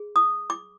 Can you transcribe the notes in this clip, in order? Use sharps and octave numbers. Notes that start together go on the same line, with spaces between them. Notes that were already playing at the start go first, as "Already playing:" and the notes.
Already playing: G#4
D#6
D6